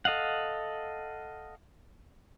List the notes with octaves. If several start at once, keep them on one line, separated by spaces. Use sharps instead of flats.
A4 D#5 F5 F#5